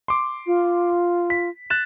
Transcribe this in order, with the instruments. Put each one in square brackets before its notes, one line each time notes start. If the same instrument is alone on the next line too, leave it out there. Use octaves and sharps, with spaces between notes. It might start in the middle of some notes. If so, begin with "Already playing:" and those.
[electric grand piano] C6 D6
[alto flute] F4
[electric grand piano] B6
F#6 A6 E7